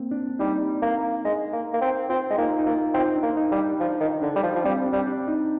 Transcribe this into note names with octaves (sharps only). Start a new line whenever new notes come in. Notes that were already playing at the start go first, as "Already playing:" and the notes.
Already playing: A#3 C4
D4
G3 D#4
A#3
G#3
A#3
A#3
C4
C4 F4
G#3
A#3 D#4
D#4
A#3 F4
C4 D#4
D4
A#3
D#4
G3
D4
F3
D#3
D3 D4
G3
F3
F3
G3 C4
D4
G3
D4
D#4